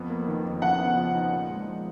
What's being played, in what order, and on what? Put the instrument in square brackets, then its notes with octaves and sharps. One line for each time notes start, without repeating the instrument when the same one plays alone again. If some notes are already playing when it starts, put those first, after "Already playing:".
Already playing: [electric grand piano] F2 B3
A#3
D#3
F2
[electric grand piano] C#3 [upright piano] F#5
[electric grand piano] B3
F3
D#4
A#2
G#3
F3